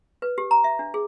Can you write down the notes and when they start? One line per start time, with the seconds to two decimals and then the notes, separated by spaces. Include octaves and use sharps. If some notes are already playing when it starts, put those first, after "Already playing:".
0.22 B4
0.38 G4
0.51 A#5
0.64 E5
0.79 D4
0.94 G#4